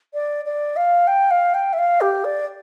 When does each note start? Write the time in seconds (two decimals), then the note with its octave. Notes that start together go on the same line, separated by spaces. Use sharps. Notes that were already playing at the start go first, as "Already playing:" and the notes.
0.14 D5
0.45 D5
0.76 F5
1.07 G5
1.31 F5
1.54 G5
1.73 E5
1.78 F5
2.01 G4
2.24 D5